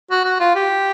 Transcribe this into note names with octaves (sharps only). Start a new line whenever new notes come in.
F#4
F#4
F4
G4